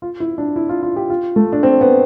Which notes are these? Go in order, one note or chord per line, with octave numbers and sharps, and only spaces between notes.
F4
E4
D4
E4
F4
F4
G4
F4
A3
D4
C4
B3